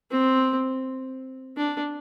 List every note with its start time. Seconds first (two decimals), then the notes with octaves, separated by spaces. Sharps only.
0.11 C4
1.57 D4